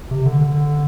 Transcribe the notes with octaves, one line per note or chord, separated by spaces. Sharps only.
C3
D3
D3